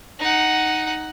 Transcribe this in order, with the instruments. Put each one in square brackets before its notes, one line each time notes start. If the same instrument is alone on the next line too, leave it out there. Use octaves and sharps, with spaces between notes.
[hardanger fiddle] D#4 F#5